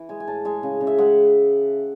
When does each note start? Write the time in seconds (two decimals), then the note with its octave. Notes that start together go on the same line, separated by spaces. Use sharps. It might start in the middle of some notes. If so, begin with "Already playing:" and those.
Already playing: E3
0.09 G#3 G#5
0.20 G#5
0.27 A2 A5
0.45 G#3 G#5
0.63 C#3
0.81 C#3
0.87 E5
0.98 G#3 F#5